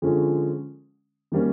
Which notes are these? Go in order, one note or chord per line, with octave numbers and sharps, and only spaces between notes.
D3 F3 G#3 C#4
D#3 G3 A#3 C#4